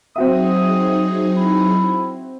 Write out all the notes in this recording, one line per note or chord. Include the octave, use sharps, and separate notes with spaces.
F#3 C4 D#4 F#4 G#4 E5 D#6
E4